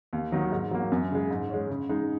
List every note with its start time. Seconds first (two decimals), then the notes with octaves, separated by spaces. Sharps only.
0.13 D#2
0.32 D#3 F#3 D#4
0.52 G#2
0.71 F#3 A#3
0.92 F#2
1.11 C#3 G#3
1.31 G#2
1.50 G#3 C#4
1.70 C#3
1.89 G#3 D#4